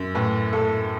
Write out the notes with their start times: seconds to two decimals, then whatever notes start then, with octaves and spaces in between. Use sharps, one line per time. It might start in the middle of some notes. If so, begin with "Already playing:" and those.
Already playing: F#2
0.15 A2 B4
0.53 A2 A4